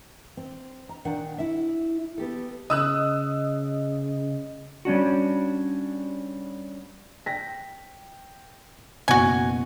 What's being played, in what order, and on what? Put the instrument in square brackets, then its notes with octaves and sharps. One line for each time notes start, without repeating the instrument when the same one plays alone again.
[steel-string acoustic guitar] C4
A#5
A#2 D#3 D4 F#5
E4 E5
B3 G4 A4
[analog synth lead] C#3 [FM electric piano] D#5 [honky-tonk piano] D#6 E6 F#6
[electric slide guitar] G3 C#4 D4 F#4
[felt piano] G5 A#6 B6
[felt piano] F#1 B2 C#7 [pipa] F#4 G#5